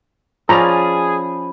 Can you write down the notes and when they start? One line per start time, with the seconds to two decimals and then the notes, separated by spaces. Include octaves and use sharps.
0.49 F3 C#4 G#4 D5 A#5 B5